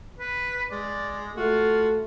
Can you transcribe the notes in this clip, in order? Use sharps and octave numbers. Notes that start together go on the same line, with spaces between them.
B4
G#3 D5
A3 F4 F#4